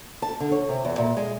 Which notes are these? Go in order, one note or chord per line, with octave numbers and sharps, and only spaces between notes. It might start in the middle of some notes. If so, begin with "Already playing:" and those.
A5
D3
C#5
C3
E2
A#2
G#3